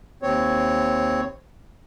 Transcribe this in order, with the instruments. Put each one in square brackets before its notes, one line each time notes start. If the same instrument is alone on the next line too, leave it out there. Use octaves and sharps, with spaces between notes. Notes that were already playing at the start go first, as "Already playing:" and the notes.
[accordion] D#2 C4 C#5